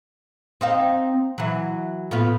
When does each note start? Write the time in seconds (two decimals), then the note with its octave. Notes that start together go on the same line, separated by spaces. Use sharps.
0.61 C4 D#4 F5
1.38 E3 F#3
2.11 A2 B3 F4